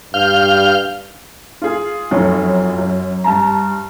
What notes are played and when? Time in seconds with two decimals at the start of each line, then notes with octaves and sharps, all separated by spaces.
0.14 G2 F5 F6 G6
1.62 F4 G#4
2.11 F1 F#2 F3 D#4 C#5
2.78 F#2
3.24 G2 A5 A#5